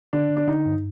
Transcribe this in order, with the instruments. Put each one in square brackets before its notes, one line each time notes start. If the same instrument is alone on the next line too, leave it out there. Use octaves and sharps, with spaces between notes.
[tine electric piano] D3 [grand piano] D4
[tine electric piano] D3
[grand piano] D4
[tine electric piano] D3 [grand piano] D#4
[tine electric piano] G2